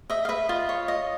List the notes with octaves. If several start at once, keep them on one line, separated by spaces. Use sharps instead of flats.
D#5 E5
F5
B4 E5
F4 D#5
C#5
D#5